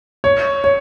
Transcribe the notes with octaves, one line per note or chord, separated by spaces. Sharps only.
C#5
C#5